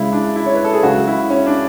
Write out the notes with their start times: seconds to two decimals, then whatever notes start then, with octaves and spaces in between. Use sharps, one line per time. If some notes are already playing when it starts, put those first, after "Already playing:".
Already playing: C#2 C#3 G#3 E4
0.12 D4
0.36 E4
0.46 C#5
0.55 B4
0.65 A4
0.73 G#4
0.83 C#2 C#3 F#3 F#4
1.07 E4
1.30 C#4
1.46 D4